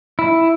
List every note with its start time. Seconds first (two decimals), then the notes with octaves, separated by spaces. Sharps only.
0.19 E4